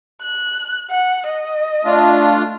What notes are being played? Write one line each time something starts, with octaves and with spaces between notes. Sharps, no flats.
F#6
F#5
D#5
A3 D4 F4